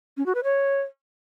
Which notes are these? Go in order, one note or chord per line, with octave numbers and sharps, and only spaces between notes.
C#4
F#4
B4
C#5